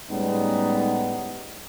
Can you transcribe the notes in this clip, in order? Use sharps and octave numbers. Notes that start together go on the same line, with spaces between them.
A2 G3 G#3 B3 C#4 D#4